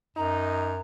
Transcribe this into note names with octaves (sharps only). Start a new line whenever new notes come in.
F#2 D#4 A#5